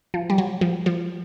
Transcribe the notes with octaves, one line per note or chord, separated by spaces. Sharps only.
F3
G3
F#3
F3
F3